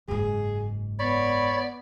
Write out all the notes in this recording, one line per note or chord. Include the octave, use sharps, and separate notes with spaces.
F#1 G#2 G#4
B3 C#5 D5 B5